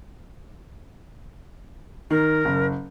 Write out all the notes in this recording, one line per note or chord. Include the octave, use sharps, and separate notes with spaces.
D#3 A#4
F#1